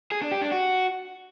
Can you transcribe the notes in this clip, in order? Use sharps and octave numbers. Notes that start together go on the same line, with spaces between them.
G#4
D4
G4
D4
F#4